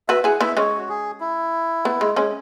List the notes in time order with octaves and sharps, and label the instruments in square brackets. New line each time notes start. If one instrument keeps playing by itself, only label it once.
[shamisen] F#4 B4 [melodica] E5
[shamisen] E4 G#4 [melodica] F#5
[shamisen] B3 E4 [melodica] E5
[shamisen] G#3 C#4 [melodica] C#5
[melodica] F#4
G#4
E4
[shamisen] B3
G#3
G#3 C#4